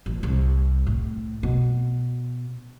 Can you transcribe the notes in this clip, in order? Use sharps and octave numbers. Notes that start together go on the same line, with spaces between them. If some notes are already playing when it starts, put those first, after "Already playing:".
A1
C2
A2
B2